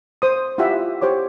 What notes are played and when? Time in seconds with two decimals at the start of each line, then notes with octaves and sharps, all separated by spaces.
0.22 C5 D#6
0.58 E4 F4 G4 E5 F#5
1.02 G4 C5 C#5 D6